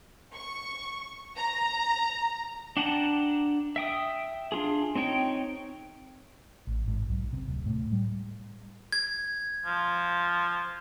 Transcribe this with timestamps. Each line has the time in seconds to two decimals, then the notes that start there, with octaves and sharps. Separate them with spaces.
0.34 C#6
1.36 A#5
2.77 D4 F#5 G5 A5 A#5
3.76 E5 G5 D#6
4.52 D4 F4 G#4
4.95 C4 D#4 C#5 G5
6.67 A1
6.87 G#1
7.10 B1
7.33 C3
7.47 D1
7.66 A2
7.92 G3
8.92 G#6
9.65 F3